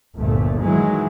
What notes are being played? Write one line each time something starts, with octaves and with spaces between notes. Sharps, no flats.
G1 D2 A#2 A3
D#3 E3 F#3 G#3